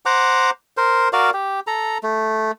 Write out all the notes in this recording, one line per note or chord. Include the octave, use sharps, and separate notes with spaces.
C5 F#5 A#5 D6
A#4 C5
F#4 A#4 D5 F5
G4
A4 A#5
A3